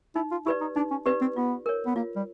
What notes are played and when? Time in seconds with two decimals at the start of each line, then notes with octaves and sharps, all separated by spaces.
0.16 D#4 E4
0.31 F4
0.46 E4 G4 B4 D5
0.61 D#4
0.76 D4 D#4
0.91 C#4
1.06 C4 G4 B4 D5
1.21 C4
1.36 B3 F4
1.66 A#4 C#5
1.86 B3
1.96 A#3 F4
2.16 G3